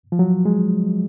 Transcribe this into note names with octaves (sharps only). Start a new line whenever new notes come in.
F3
F#3
G#3